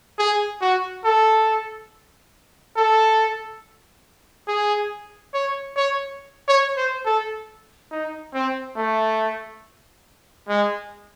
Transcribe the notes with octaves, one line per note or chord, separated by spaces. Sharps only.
G#4
F#4
A4
A4
G#4
C#5
C#5
C#5
C5
A4
D#4
C4
A3
G#3